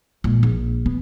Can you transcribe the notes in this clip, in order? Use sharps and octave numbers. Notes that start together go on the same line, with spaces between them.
A#2 G#3
A#1
B3